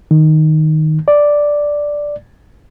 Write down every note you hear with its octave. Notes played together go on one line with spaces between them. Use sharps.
D#3
D5